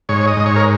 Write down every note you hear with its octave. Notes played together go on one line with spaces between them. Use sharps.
G#2 C#5
D#5
G#2
C#5
A#4